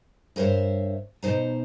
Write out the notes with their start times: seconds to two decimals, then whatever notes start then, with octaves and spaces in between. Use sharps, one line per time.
0.36 G2 A#4 C5 C#5 E5
1.23 B2 D#4 C5 A#5